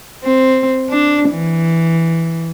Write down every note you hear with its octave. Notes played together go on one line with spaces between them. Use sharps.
C4
D4
E3